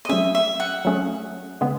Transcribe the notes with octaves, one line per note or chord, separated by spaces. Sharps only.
D#5
F#3 A3 C#4 G#4 E5
E5
F#5
F#3 A3 C#4 G#4
C#3 G#3 B3